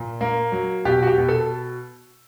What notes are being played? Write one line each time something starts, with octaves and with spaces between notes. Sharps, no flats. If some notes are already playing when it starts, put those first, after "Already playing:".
Already playing: A#2
A#3
F#3
B2 G4
F#4
G4
B2
A4